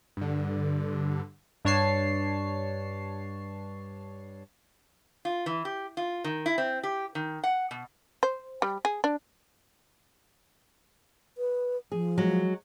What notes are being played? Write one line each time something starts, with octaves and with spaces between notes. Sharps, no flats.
G2 D3
G2 D4 C#5 A5 C7
F4
E3
G4
F4
D#3
E4
C4
G4
D#3
F#5
B2
C5
G3
G#4
D4
B4
F3 G#4
F#3 G#3